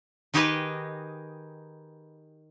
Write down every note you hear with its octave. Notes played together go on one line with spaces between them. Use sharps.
D#3 D#4 G4 G#4 B4 D#5